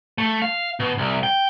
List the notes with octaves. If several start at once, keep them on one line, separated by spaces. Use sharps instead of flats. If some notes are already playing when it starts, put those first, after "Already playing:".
A3
F5
B2
C2
G5